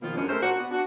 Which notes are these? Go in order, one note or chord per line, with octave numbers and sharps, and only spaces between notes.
B2 D#3 F3 A#3 F4
F#2 G#3 C#4 D4
G#3 A3 C4 A#4 C5
A#2 D4 F#4
B3
D4 F#4